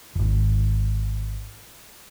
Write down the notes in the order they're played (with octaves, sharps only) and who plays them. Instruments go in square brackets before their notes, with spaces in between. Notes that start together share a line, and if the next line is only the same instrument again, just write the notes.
[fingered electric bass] D1 G#1